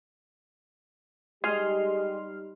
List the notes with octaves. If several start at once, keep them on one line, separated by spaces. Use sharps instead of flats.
G3 G#3 D#4 G4 G#4 C6 F6